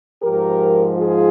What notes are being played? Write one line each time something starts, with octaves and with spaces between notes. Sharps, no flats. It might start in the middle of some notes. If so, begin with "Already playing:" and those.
G#2 F3 G4 A#4
F4 G#4